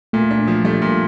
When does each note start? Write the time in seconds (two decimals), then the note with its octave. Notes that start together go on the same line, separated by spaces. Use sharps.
0.13 A#2 A3
0.31 D4
0.47 F3
0.65 G3 A3
0.82 A#2